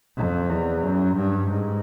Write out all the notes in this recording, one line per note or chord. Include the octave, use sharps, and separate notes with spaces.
F2
E2
F#2
G2
G#2